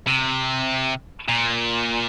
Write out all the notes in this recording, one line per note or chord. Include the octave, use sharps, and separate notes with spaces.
C3
A#2